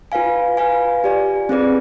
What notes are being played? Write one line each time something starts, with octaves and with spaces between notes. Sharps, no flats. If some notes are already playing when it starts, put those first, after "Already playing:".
F4 B4 F5 G#5
F4 B4 F5 G#5
G4 D5 G#5
C4 F4 G#4 B4 D5